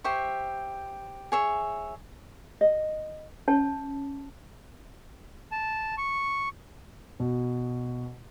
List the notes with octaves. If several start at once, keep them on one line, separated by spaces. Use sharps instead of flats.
G4 C5 E5 C#6
G#4 C#5 E5
D#5
C#4 C#5 A5
A5
C#6
B2